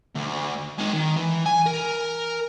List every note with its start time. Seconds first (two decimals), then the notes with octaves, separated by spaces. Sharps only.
0.16 D2
0.78 D#3 G#3
0.94 D#3
1.17 E3
1.46 G#5
1.66 A#4